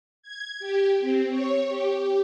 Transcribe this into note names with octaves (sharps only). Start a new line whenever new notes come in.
G#6
G4
C4
C#5
G4